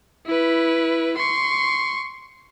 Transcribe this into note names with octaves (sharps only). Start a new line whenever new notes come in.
E4 B4
C6 C#6